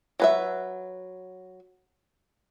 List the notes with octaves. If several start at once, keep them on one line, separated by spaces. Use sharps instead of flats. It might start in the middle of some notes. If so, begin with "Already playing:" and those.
F#3 B4 E5